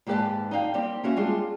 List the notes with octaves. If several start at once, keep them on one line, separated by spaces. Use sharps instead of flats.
D#2 G#2 G4 B4 D5 A5
D#4 D5 F5 G5
G3 A#3 C4 G4 D5
A#3 C#4 F#4 E5
G3 G#3 D4 F4 G#4